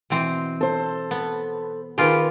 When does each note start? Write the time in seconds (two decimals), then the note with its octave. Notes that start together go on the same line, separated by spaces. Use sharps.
0.10 B2 E3 C4
0.61 A4 C5
1.11 B3
1.98 D#3 F4 G4 G#4 B4